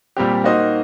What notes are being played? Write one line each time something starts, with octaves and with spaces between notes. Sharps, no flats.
A#2 G3 C4 G4
A#3 D#4 F#4 C5 D#5